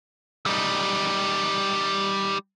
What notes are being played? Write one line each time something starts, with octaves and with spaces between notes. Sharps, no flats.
G3 D#4